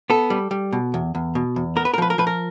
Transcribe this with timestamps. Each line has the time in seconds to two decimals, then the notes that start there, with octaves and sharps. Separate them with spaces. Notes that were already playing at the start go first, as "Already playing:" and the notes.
0.10 B3 A4
0.30 G3
0.51 G3
0.73 B2
0.94 E2
1.15 E2
1.35 B2
1.56 E2
1.76 B3 A#4
1.85 B4
1.94 A#4
1.98 F3 B4
2.10 A#4
2.18 F3 B4
2.27 A#4